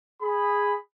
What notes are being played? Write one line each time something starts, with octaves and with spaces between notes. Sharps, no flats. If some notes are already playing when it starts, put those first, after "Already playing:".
G#4 B5